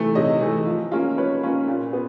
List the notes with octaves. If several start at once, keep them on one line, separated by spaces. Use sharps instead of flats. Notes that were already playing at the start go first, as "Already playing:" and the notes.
Already playing: C3 E3 A3
C3 C#5 D#5
E3 A3
F3
A#3 C#4 F4
F3 B4 C#5
A#3 C#4 F4
A#2
B3